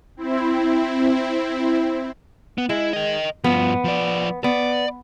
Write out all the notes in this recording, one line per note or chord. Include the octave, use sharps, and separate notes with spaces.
C4 E4
B3
G#3 E4
A#4 D#5
G2 F3 B3
F3 D5
B3 D5